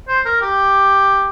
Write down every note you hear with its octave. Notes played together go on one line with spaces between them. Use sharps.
C5
A#4
G4